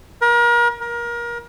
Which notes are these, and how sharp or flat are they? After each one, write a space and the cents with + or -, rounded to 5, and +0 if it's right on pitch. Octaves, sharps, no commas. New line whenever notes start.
A#4 +35
A#4 +25